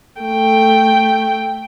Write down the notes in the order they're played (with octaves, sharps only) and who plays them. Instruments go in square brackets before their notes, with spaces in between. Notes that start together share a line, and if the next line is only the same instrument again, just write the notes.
[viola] A3 G5